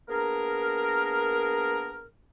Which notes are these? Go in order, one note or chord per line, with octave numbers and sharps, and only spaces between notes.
A#3 B3 D4 G#4 A#4